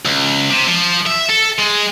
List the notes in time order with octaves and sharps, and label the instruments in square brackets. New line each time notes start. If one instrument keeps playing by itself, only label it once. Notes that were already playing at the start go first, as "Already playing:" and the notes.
[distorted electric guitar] C#2
C3
F3
E5
A4
G#3